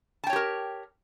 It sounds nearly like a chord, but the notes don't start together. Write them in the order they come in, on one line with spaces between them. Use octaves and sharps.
A5 G5 C#5 G4 A#4